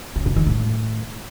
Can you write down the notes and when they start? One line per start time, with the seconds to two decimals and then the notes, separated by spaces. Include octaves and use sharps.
0.16 C#3
0.26 G#2
0.36 D#3
0.47 A2